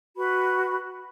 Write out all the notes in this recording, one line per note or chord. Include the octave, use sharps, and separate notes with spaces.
F#4 B4 B5